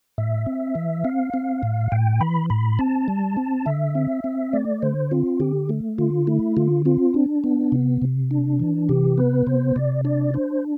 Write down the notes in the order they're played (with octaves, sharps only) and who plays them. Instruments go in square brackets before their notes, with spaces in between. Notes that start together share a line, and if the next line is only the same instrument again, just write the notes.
[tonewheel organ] A2 E5
C4
E3
C4 F5
C4
A2
A2 G5
E3 B5
A2 B5
C4 A5
G3
C4
D3 E5
C4
C4
A3 D5
D3 C5
C4 F4
D3 G4
A3
D3 F4
A3 E4
D3 F4
C4 F4
D4
B3
C3
C3
D4
E3
C3 G4
B3 B4
C3 C5
C3 D5
D4 D5
D4 C5